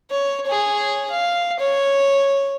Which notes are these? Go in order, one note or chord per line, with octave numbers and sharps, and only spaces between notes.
C#5
G#4 C#5
F5
C#5